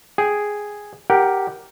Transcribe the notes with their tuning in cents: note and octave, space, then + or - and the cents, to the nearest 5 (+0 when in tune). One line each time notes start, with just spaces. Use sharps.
G#4 +0 G5 +0
G4 +0 A#4 +0 F#5 +20